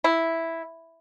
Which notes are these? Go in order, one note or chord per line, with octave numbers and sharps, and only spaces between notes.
E4